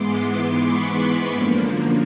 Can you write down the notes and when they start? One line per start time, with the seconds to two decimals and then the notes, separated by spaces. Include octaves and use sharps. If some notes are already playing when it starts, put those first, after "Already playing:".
Already playing: G#2 E3 G#3 B3 C6 D6
0.21 C6 D6
0.57 B5 C#6
1.31 F#2 D3 F3 A#3